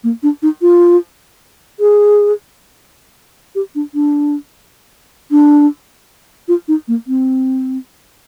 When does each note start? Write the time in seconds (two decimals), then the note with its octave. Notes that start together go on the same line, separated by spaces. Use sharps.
0.04 A#3
0.23 D4
0.43 D#4
0.62 F4
1.80 G#4
3.55 G4
3.75 D4
3.94 D4
5.31 D4
6.48 F4
6.68 D#4
6.88 A#3
7.07 C4